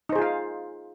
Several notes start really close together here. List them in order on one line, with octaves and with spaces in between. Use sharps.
D#4 C5 G#4 F4 F5